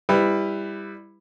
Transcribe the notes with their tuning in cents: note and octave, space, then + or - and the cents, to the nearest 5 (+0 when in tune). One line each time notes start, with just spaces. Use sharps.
G3 +20 E4 +0 B4 +20